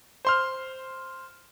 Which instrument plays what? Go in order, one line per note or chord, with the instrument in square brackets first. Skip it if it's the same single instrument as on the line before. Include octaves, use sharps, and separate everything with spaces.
[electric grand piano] C5 C6 F6